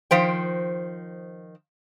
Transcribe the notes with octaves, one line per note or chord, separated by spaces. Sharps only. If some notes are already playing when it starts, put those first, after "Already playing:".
D#3 F3 C5 G5